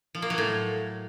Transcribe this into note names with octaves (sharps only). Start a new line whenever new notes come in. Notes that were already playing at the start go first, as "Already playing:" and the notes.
F3
A#3
F#3
A2